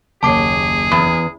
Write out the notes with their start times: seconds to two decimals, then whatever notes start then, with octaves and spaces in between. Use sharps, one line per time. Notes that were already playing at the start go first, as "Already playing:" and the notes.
0.23 F#1 D#2 G#4 C#5 A5 D6 C7
0.91 E2